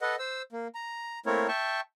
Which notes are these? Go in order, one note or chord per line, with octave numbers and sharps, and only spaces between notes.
A4 B4 D#5 F#5
C5 E6
A#3
A#5
A3 A#3 C4 E4 A#4 C#5
E5 G5 A5 C#6